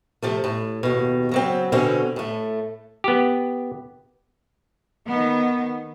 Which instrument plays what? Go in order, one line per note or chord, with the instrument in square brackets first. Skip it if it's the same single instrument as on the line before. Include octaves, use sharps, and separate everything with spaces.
[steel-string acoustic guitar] C3 F3 A3
A2
D#2 B2
C#3 F#3 C4
B2 D3 C4 C#4
A2 A3
[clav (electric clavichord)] B3 G4
[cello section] D#3 B3